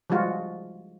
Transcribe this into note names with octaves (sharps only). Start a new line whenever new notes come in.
F3 G3 G#3 F4 F#4